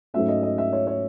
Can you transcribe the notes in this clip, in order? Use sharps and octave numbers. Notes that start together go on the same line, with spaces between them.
G#2 F#3 A3 C#4 E5
D#5
D#5
E5
C#5
C#5